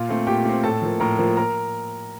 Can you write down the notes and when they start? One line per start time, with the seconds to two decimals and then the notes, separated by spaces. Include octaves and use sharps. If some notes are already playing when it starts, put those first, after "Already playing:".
Already playing: A#2 F4 F5
0.09 A3 C4
0.27 A#2 G4 G5
0.45 A3 C4
0.63 A2 A4 A5
0.82 F3 A#3
1.00 A2 A#4 A#5
1.19 F3 A#3
1.37 A#4 A#5